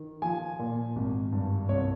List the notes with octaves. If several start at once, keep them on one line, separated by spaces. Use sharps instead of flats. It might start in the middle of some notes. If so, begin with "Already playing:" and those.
Already playing: D#3
F3 G#5
A#2
G#1
G2
C2 C#5